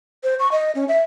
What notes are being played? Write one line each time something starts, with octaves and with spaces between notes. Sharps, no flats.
C5
C#6
D#5
C#4
E5